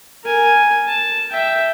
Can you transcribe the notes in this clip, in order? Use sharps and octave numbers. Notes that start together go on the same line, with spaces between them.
A#4 G#5
A5
E5 G5